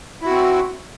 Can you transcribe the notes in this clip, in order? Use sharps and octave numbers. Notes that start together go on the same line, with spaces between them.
C4 E4 F#4